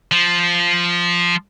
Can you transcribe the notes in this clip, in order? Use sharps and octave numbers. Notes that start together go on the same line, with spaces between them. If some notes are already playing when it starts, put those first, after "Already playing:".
F3